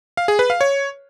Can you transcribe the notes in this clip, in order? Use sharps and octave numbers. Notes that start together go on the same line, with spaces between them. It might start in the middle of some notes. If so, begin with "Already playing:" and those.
F5
G#4
B4
F5
C#5